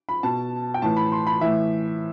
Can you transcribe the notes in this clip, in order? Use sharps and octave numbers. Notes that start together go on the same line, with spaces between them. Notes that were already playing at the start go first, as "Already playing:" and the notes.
B5
B2 A5
G5
A2 E3 A5
B5
C6
B5
A2 E3 E5